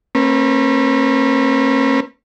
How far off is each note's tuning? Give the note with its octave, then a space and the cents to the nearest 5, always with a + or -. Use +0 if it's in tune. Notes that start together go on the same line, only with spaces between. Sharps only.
A#3 -35 C#4 -45 B4 -20